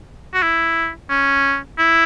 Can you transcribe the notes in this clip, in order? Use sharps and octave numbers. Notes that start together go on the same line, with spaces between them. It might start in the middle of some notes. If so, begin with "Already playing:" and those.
F#4
E4
C#4
E4